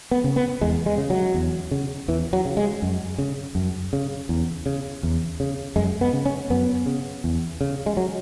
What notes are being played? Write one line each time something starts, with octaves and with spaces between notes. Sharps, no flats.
B3
C#3
B3
E2 G#3
G#3
C#3
F#3
E2
C#3
E2 E3
F#3
C#3
G#3
F#2
C#3
F#2
C#3
E2
C#3
E2
C#3
F#2 G#3
B3
C#3
C#4
F#2 B3
C#3
E2
C#3
G#3
F#3